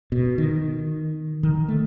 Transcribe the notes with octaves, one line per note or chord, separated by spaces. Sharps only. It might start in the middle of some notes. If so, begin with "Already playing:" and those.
B2
D#3
D#3
A3